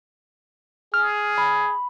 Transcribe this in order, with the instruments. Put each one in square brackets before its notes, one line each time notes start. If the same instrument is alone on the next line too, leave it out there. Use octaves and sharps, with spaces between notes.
[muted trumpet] G#4 [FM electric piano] F6
[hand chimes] B5